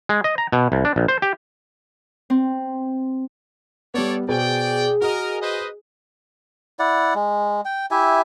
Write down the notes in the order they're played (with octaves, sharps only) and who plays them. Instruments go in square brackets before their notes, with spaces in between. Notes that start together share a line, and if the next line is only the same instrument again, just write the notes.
[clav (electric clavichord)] G#3
D#5
A#5
B2
C2
D4
A#1
C5
G4
[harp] C4
[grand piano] G3 B3 [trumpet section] A4 C#5 D5
[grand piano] B2 C5 [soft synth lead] G#4 [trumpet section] D5 G5
[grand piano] F#4 [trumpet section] A#4 D#5
[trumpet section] B4 C5 D#5
[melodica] E4 D5 F#5
G#3
G5
E4 G4 E5 G#5